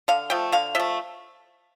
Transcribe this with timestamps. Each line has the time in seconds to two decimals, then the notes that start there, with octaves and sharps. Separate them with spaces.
0.08 D3 F5
0.30 F3 A3 G5
0.52 D3 F5
0.75 F3 A3 E5